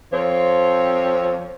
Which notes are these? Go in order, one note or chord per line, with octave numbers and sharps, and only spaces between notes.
F2 F3 C4 C#5